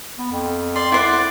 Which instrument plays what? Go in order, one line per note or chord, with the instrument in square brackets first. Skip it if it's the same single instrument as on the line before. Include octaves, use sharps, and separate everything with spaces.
[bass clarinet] B3
F2
[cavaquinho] D5 [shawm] C6
[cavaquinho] E4 C5 F#5 [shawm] D5